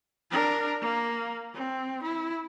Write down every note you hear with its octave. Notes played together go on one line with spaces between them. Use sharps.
D4 A#4
A#3
C4
E4